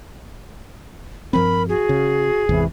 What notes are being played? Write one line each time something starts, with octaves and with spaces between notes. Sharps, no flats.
G2 F3 C4 A#4 B5
F#4 G#4
C#3
G#1 E2 C3 E3